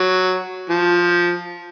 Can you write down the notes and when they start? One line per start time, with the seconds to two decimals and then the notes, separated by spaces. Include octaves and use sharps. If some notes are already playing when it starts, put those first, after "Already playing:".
Already playing: F#3
0.70 F3